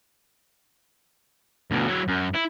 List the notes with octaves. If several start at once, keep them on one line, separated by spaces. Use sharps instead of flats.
D2 B2
F#3 E4
F#2
E4